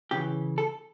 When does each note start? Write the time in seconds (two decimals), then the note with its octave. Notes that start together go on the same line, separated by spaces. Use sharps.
0.11 C#3 E3 G4
0.58 A4